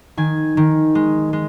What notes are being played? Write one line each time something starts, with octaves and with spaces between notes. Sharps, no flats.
D#3 G#5
D#3
G#3
G#3